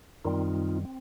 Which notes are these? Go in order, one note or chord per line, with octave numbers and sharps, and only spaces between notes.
F#2 D#3 G3 C4 D#4 F4
C4